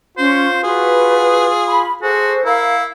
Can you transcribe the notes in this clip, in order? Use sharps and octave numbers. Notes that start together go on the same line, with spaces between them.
C#4 F4 C5
F#4 G#4 B4
B5
F#4 G#4 A4 C5
E4 A#4 F5